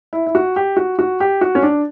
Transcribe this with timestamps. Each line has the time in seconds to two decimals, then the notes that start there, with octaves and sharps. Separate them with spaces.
0.13 E4
0.26 E4
0.35 F#4
0.56 G4
0.77 F#4
0.99 F#4
1.20 G4
1.41 F#4
1.55 C#4
1.63 D4